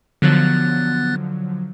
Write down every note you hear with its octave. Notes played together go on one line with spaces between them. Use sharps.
D3 F3 F#3 B3 F#6 A6